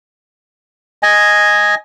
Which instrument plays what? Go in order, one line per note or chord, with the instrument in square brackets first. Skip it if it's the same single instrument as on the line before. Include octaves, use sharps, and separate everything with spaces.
[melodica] D#5 G#5